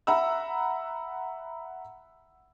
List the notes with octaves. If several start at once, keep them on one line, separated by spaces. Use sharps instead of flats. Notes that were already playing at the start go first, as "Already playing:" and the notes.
E5 F#5 A#5 B5 E6